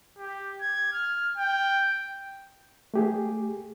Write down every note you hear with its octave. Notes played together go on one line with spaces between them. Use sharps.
G4
G#6
F6
G5
A3 G4 G#4